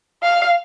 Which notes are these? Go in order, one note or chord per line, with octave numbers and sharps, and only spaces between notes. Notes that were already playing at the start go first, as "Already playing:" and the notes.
F5